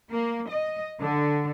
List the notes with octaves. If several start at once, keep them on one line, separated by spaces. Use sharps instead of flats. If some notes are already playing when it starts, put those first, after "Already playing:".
A#3
D#5
D3